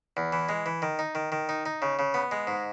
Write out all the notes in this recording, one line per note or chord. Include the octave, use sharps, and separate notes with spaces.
E2
E3
G#3
E3
D#3
D#4
D#3
D#3
D#4
D#4
C#3
C#3
B3
G#3
G#2